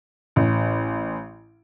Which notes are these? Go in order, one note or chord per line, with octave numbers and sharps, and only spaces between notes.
A1